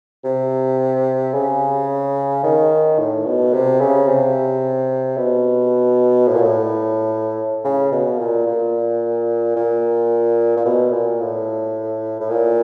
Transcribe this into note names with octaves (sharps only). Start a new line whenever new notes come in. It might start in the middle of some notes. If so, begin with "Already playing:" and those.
C3
C#3
D#3
A2
B2
C3
C#3
C3
B2
A2
A#2
A2
C#3
B2
A#2
A#2
A#2
A#2
B2
A#2
A2
A2
A#2